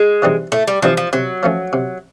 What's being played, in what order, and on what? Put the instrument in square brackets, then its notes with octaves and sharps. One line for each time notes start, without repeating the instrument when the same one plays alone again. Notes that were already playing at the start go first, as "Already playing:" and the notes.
Already playing: [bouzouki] G#3
[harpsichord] E3 G3 C4 D#4
[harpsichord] A2 [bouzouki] A3
[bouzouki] G3
[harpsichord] E3 G3 C4 D#4 [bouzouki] F3
[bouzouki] F3
[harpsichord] C3 [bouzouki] F#3
[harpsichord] F3 A3 C#4
C3